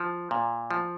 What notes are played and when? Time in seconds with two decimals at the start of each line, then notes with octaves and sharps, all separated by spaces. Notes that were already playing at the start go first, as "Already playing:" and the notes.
Already playing: F3
0.31 A#2
0.71 F3